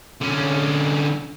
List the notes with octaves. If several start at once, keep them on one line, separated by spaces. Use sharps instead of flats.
D3 C#4